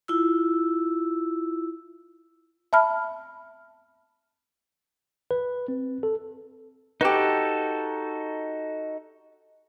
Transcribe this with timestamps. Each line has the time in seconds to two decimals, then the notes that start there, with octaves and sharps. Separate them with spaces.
0.08 E4 F4 E6
2.73 E5 A5 B5 F6
5.31 B4
5.68 C4
6.03 A4
7.01 D#4 F#4 G4 A4 B4